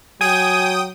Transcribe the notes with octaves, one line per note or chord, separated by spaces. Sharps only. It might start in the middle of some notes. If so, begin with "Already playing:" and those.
F#3 G5 G#5 D#6